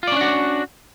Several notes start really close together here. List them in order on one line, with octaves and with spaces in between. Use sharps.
F4 D5 C#4 D4 F#4